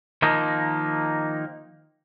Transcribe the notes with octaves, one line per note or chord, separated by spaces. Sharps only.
D#3 F3 A#3 D#4